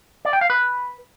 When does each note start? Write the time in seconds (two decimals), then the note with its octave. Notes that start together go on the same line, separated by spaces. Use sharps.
0.25 D5
0.33 G5
0.41 F5
0.50 B4